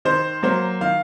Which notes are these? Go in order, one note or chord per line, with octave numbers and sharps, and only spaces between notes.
D#3 C5
F#3 A#3 C5
D#3 F5